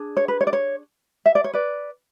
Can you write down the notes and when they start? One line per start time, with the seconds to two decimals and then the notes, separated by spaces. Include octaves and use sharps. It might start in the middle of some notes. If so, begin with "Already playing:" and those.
Already playing: D4 G#4
0.17 C#5
0.28 B4
0.41 C#5
0.47 D5
0.53 C#5
1.26 E5
1.35 D5
1.44 C#5
1.53 B4 D5